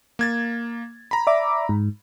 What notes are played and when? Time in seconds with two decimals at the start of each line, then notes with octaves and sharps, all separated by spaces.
0.19 A#3 G#6 A6
1.11 A#5 B5
1.27 D5 E5 D6
1.69 G#2